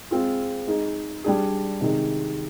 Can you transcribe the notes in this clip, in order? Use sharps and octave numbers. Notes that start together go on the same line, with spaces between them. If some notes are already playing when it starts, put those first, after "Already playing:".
G#3 C4 F4 G#4
G#3 D#4 G#4
G3 D4 G#4
C3 D#3 G#3